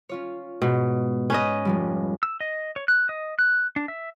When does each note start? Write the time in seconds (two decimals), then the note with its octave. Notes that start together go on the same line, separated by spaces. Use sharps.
0.09 C#4 F4 C#5
0.62 G#2 B2 D#4
1.30 C#4 B4 D#5
1.65 F1 F3 G3
2.23 E6
2.41 D#5
2.76 C#5
2.88 F#6
3.09 D#5
3.39 F#6
3.76 D4
3.88 E5